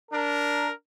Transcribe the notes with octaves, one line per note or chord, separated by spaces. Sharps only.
D4 A#4